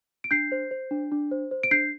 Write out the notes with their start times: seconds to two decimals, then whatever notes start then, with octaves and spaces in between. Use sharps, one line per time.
0.24 D7
0.31 D4 G6 C7
0.52 C5
0.71 C5
0.91 D4
1.12 D4
1.31 C5
1.51 C5
1.63 D7
1.71 D4 G6 C7